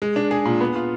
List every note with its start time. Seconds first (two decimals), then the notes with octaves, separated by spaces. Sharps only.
0.02 G#3
0.16 D4
0.31 G#4
0.45 A#2
0.61 B3
0.75 F4